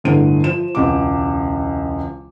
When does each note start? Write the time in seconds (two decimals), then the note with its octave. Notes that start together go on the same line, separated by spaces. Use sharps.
0.04 G1 A2 D3 D#7
0.44 F3 E7
0.75 E1 C#2 D6